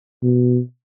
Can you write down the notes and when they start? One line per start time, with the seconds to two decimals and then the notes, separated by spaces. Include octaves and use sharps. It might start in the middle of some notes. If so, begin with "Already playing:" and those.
0.23 B2